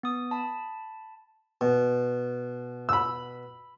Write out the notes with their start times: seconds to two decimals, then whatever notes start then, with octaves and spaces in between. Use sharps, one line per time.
0.03 B3 D#6
0.31 A5 B5
1.61 B2
2.89 B5 E6